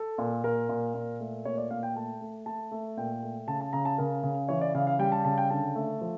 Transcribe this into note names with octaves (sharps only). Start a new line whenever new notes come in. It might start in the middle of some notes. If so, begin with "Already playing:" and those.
Already playing: A4
A#2
A#2 A#4
A#2
A#2
A3
A#2 C#5
D5
A#2 F5
G5
A3 A5
A3
A3 A5
A3
A#2 G5
A3
C#3 A5
A5
C#3 A#5
A5
C#3 A#4
C#3
E3 C#5
D5
C#3 F5
F5
G3 G5
A5
C#3 A5
G5
D3 A5
A3
F3